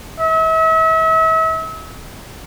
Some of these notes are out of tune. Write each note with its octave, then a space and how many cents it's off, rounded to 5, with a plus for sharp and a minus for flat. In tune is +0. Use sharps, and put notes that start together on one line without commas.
E5 -40